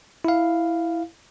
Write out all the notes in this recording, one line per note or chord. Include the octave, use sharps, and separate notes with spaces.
E4 F5